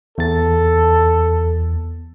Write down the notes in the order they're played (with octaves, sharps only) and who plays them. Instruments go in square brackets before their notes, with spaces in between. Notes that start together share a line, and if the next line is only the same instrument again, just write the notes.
[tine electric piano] E2 A6 [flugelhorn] A4